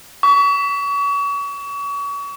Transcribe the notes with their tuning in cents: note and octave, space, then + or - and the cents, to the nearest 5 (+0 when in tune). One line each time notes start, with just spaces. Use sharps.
C#6 +35